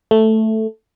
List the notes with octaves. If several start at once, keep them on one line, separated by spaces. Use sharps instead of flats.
A3